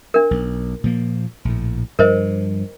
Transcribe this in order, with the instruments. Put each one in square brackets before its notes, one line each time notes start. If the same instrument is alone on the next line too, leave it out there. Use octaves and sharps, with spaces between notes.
[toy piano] D4 A#4
[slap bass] B1
A#2 F3 A#3
A#1 A2
[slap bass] G2 F3 [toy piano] A#4 C5 D#5